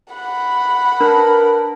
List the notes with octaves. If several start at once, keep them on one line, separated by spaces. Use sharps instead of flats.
F#5 B5
D4 A#4 B4